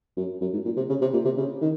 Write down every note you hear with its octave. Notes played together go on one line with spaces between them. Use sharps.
F#2
F#2
G#2
A#2
C3
C#3
C3
A#2
C3
C#3
D#3